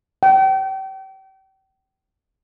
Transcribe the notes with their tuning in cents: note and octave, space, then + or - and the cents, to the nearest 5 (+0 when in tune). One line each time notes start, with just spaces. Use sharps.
G5 -35